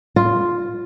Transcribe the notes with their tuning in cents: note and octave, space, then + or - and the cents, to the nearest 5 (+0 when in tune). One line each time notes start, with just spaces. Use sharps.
F4 +0